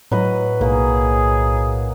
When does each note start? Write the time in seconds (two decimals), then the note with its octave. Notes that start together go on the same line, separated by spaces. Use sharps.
0.11 A2 F#3 B4 D#5
0.61 B1 A2 A#3 G#4